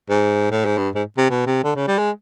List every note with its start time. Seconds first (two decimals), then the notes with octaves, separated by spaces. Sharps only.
0.10 G#2
0.51 A2
0.65 G#2
0.78 G2
0.95 G#2
1.18 C3
1.30 B2
1.47 C3
1.63 D3
1.75 C#3
1.88 G3
1.98 G#3